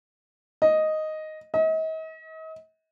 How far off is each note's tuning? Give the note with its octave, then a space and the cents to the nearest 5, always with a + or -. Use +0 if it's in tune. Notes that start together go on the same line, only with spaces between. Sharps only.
D#5 +0
D#5 +40